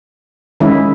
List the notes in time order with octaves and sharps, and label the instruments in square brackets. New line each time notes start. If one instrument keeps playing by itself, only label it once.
[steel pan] D#3 G#3 C#4 E4